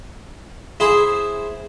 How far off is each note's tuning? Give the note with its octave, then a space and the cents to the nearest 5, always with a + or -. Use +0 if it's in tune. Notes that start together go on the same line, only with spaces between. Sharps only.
E4 +0 G#4 +0 C5 +0